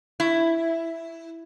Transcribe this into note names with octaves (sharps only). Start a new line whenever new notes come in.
E4